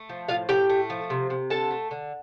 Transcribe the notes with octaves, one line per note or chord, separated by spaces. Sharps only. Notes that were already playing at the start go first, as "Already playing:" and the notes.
Already playing: A3
F3
A2 F4 F5
A2 G4 G5
A3
F3
C3
C3
D3 A4 A5
A3
D3